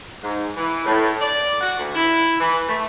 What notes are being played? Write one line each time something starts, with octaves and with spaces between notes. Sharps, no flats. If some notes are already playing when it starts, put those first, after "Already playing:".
G#2
E3
A2
D5
F#4
D2
E4
E3
A3